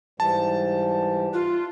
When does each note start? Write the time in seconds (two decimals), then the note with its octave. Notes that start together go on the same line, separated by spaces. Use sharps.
0.20 G#2 E3 G3 A5
1.34 F4 F#6